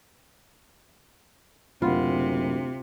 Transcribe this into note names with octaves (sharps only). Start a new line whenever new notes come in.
F#1 D2 C3 F4 F#5 B5